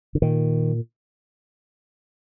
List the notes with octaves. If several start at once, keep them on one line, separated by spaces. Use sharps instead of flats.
D3
A#2 D#3